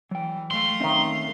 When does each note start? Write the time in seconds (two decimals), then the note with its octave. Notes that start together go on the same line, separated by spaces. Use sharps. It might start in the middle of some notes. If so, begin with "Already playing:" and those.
0.11 E3 F#3 G5
0.51 A3 F5 C6
0.80 D#3 C4 C#4 D#4 E5